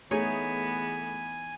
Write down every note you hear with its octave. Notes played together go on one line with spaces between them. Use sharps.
E3 A3 B3 D#4 G#4 C#5 G#5